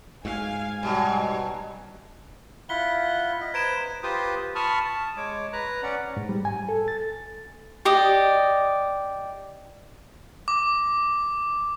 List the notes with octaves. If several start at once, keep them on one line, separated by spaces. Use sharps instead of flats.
G#2 F5 G#5
B2 F#3 G3
E4 F4 F#5 B6 G7
D#5
B4 C5 A#5 G#6 D7 E7
F4 G4 B4 C5 D#6
A5 B5 C#6 D#6 F6
A5
G#3 C#5 D6
B4 A#5 F#6
C#4 D5 F#5
G#2
G3
G#5
A4
A6
G4 D5 D#5
D6